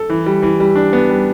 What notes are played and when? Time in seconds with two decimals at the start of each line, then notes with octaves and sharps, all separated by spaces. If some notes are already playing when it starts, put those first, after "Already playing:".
Already playing: A4
0.09 E3
0.26 G3
0.42 E3
0.60 G3
0.76 D4
0.93 B3
1.09 G3